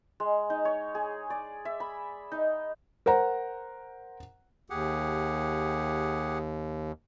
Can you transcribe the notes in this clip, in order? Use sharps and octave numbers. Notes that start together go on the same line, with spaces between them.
G#3
D#4
C#5
G#4
D5
E5
B5
D#4
A#4 C5 F#5 A#5
D#2 G4 G#4 F#5